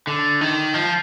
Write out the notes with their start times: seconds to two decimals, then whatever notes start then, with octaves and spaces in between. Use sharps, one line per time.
0.07 D3
0.41 D#3
0.74 F3